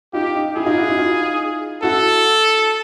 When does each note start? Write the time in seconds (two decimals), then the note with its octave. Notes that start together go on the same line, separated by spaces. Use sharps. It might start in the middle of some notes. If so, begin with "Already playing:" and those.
0.13 D#4 F4 G4
0.35 D#4
0.56 E4 G#4
0.66 D#4 F4
0.77 E4 F#4
0.88 E4 F#4
0.98 D#4 F4
1.82 E4 F#4 A4